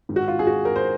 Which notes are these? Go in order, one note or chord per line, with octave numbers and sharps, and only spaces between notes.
G#2 D#3
F#4
F4
G#4
F#4
A#4
C5